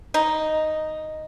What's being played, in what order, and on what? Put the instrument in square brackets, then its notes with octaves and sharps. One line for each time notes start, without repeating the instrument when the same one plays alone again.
[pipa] D#4